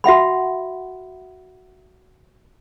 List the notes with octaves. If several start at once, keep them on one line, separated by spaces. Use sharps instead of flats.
F#4 E5 F#5 B5